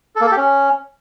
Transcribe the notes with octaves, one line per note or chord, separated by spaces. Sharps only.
A4
A#3
A4
G4
C#4